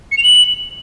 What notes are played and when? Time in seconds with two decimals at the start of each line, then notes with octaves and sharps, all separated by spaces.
0.11 C#7
0.17 F7
0.23 F#7